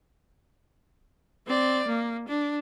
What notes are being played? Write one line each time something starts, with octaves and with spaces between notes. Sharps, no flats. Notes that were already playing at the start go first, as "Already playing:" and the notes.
C4 D5
A#3
D4